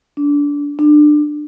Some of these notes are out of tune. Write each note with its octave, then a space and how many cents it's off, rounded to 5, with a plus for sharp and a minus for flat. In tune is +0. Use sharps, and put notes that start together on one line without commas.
D4 -25
D4 +25